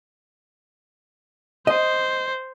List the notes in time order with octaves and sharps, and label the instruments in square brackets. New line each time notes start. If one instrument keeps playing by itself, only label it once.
[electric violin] C5 [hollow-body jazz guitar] D#5